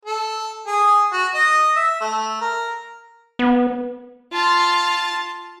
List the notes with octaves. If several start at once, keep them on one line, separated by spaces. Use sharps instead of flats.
A4
G#4
F#4
D#5
E5
A3
A#4
B3
F4 A5